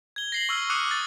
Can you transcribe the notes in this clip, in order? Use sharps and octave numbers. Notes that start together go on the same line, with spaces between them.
G#6 G7
A#6 C7 F#7
C#6 E6 F6
D6 D#6 F#6 A#6 C#7 D#7
A6